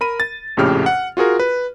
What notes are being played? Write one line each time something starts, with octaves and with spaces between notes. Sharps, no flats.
A#4 B5 D#7
A6
A#1 F2 A2 C#3 G4 F6
F#5
F4 F#4 G#4 A#4
B4